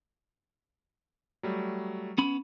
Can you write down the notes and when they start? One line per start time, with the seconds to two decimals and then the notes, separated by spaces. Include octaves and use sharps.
1.43 F#3 G3 A3
2.18 B3 C#4 B5